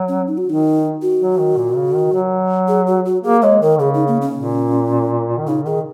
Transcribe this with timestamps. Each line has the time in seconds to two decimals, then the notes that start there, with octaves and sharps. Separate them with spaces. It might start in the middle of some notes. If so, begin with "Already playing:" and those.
Already playing: F#3
0.08 C#4
0.27 D#4
0.38 F#4
0.46 D#3 D#4
1.02 F#4
1.20 F#3
1.39 D#3
1.57 A#2
1.76 C#3
1.94 D#3
2.12 F#3
2.68 G#4
2.87 F#4
3.05 F#4
3.24 A#3 G#4
3.42 G#3 C#5
3.62 D#3 A#4
3.80 C#3 G#4
3.94 D#4
4.08 A#3
4.22 C#4
4.35 A#2
5.38 D#3
5.47 C#3 D#4
5.66 D#3 G#4